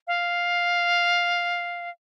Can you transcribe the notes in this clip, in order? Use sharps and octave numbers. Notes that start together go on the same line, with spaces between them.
F5